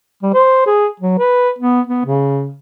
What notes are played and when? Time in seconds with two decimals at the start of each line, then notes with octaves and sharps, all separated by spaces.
0.23 G3
0.34 C5
0.67 G#4
1.00 F#3
1.19 B4
1.59 B3
1.87 B3
2.05 C#3